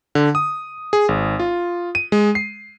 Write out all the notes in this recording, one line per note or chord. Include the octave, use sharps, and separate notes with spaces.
D3
D#6
G#4
G#1
F4
D#7
G#3
C7